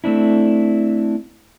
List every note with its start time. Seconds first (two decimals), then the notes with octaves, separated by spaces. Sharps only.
0.04 A3 C4 D4 E4